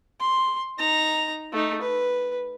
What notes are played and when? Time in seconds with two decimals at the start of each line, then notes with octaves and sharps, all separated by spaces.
0.20 C6
0.78 D#4 A#5
1.52 A3 D#4
1.82 B4